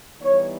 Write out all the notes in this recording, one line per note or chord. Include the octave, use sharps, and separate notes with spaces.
E3 G3 B3 D#4 C#5